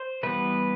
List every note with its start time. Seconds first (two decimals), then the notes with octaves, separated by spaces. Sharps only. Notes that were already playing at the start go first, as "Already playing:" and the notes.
Already playing: C5
0.23 E3 G3 B3 B4